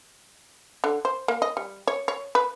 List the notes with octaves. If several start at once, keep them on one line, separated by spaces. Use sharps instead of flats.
D3
C5
A#3
D#5
G3
C#5
C#5
B4